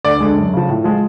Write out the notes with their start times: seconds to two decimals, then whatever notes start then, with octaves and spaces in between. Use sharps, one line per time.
0.05 D2 D5
0.20 D3 G#3
0.37 F#2
0.53 C#3 F3
0.69 A2
0.84 F3 G#3